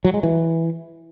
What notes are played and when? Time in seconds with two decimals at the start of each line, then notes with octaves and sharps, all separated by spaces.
0.04 F#3
0.14 G#3
0.23 E3